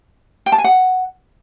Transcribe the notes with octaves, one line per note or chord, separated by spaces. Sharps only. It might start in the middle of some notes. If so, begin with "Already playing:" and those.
G5
A5
G#5
F#5